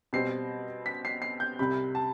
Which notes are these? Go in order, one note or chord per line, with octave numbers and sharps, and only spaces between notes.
B2 G3 C4 C7
B6
C7
C7
G6
C2 C3 G3 B5
A5